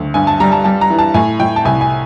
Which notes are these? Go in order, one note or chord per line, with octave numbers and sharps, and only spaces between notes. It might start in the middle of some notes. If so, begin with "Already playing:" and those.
Already playing: D2
G2 G#5
A5
G3 A#5
A5
G3 A5
A#5
E3
A5
A2 G#5
A2 G5
A5
C2 G#5
G#5